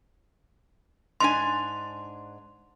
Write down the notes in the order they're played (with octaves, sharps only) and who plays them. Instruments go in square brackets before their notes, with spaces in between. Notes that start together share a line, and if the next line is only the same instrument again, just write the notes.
[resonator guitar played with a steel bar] G#2 D4 G#5 [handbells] C6